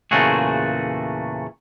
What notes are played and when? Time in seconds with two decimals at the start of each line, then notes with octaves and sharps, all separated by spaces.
0.11 E2 A#2 C#3 A3 F#4 G#4